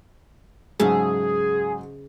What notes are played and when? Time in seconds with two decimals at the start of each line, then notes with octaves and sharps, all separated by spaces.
0.79 G#2 C#3 F#3 G#4 E5 A5